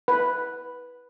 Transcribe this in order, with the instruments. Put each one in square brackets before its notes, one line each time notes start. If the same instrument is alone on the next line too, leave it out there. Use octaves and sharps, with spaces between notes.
[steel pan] B4